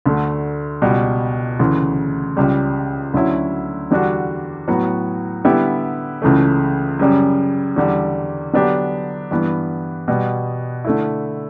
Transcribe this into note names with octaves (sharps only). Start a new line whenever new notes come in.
D2 D3 A3
C#2 B2 G3
D2 C#3 E3
C#2 C#3 G3
D2 D3 F#3 C#4 E4
E2 D3 G3 D4 F#4
A2 F#3 B3 F#4
D3 G3 B3 E4 G4
C#2 C#3 E3 A3
F#2 C#3 G3
E2 D3 G3
D3 F#3 B3 D4 G4
G2 E3 B3
B2 G3 B3
D3 A3 E4